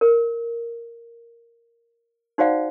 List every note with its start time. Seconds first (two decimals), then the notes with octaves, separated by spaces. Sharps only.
0.01 A#4
2.38 D#4 F#4 C5 D5 F5 F#5